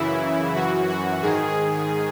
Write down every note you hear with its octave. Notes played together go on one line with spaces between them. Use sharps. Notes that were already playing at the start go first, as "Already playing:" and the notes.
Already playing: F#2 C#3 E3 E4
F#2 E3 F#4
F#4
G#2 D#3 G#4